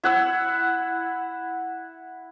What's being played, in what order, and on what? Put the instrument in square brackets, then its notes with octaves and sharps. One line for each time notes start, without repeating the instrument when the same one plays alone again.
[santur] E4 F#5 E6